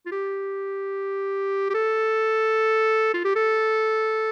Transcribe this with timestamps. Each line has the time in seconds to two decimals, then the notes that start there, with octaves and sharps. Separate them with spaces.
0.06 F4
0.12 G4
1.70 G4
1.74 A4
3.14 F4
3.24 G4
3.36 A4